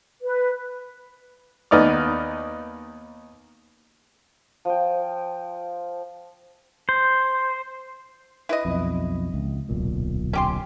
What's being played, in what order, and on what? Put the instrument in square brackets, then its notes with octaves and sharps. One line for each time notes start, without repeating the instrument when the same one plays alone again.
[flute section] B4
[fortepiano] D#2 B3 D#4 D5 F6
[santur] F3 G5
[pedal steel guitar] C5
[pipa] E4 B4 D#5
[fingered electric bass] B1 F2
C#2
D1 B1 A#2
[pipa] C#4 G4 C6